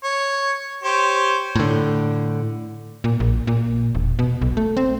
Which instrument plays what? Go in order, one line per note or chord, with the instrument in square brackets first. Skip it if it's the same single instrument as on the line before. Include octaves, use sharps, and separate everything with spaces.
[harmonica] C#5
G4 C5 C#5
[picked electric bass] A2 D3
[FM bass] A#2
A#1
A#2
E1
B2
B1
A3
C4